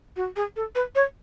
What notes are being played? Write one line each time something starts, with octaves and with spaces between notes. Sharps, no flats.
F#4
G#4
A4
B4
C#5